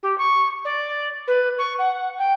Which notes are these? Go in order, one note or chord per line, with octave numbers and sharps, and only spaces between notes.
G4
C#6
D5
B4
C#6
F#5
G5